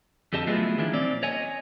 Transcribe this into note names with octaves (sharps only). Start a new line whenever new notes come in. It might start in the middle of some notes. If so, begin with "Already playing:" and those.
F2 D3 G4 D#5 A5
F#3 A3 B3 E4 F4 G#4
D#3 F3 D4 E4
A#2 C4 C#4 D5
C#5 D#5 G#5